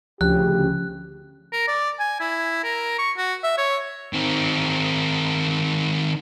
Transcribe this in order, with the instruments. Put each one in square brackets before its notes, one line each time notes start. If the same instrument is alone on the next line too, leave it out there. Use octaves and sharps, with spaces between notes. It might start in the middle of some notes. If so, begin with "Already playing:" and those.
[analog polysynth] D2 C#3 [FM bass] F3 [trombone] G4 [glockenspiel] F#6
[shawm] A#4
D5
G#5
E4
A#4
C#6
F#4
E5
C#5
[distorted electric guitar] D#3 C4